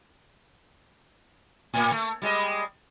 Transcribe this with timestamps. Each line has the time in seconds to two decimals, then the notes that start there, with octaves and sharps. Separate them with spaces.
1.74 A2 A#3
1.92 A3
2.22 G3 G#3 D#5